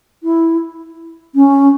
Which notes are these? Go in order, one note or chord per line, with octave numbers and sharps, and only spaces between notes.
E4
C#4